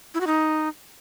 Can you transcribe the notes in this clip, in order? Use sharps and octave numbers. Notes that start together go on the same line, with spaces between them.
E4
F#4
D#4